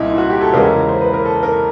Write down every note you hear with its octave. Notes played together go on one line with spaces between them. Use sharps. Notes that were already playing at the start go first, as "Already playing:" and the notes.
Already playing: C2 A#2 D#4 E4
F#4
G4
A4
E2 C#3 E3 G#3 A#4
C5
B4
A#4
A4
A#4